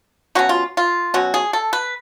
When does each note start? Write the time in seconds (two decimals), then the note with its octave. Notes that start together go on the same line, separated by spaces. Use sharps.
0.35 B2 F#3 C#4 F#4
0.49 F4
0.77 F4
1.14 B2 F#3 C#4 F#4
1.34 G#4
1.53 A4
1.73 B4